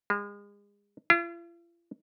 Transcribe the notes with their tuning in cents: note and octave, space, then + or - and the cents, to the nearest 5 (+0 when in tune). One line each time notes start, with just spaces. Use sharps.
G#3 -35
F4 -45